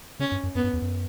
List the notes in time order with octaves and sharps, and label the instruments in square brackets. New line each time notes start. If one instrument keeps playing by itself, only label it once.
[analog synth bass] C#3 [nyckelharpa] C#4
[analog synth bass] G2
F#2
[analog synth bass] F#2 [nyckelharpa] B3
[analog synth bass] G2
E2
F#2